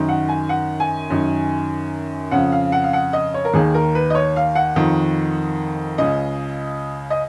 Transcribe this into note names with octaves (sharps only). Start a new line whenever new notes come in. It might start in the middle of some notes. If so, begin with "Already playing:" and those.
Already playing: F#2 D#3
F#5
G#5
F#5
G#5
F#2 D#3
F2 C#3 F#5
F5
F#5
F5
F#5
D#5
C#5
A#4
D#2 D#3 G#4
A#4
B4
D#5
C#5
F5
F#5
F2 D#3
C#2 C#3 D#5
D#5